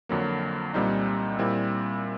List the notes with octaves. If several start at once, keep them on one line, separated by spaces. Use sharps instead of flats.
F2 D3 F#3 A#3
C2 A#2 G3 C4 D#4
A#2 G3 C4 E4